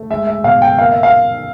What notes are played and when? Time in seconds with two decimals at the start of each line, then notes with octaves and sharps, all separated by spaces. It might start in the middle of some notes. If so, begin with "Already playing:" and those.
Already playing: A3
0.10 G#3 E5
0.27 E5
0.44 B2 F5
0.62 G5
0.78 A#3 F5
0.91 E5
1.03 F5